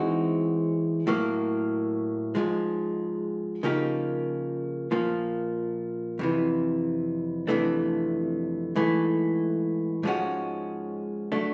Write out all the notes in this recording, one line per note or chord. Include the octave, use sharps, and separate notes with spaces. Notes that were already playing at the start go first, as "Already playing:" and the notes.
Already playing: E3 G#3 C4 D#4 F#4
A2 F#3 A#3
G#2 F3 G#3
C#3 F3 A#3 D#4 G4
A#2 F3 A#3
F2 C3 E3
F2 C3 E3 A3 D4
G#2 E3 A3
G#2 F3 G#3 C#4 F#4
F#3 A3 D4